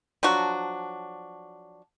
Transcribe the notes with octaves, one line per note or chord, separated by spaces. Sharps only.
F3 F#3 D4 F#4